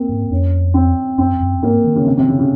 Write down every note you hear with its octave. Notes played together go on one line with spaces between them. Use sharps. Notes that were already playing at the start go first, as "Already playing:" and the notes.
Already playing: A#3 C4
G#2
F2 C#4
C4
F#2 C4
F#2
G#2 A#3
D#3
C#3
C3
C3
C#3
C#3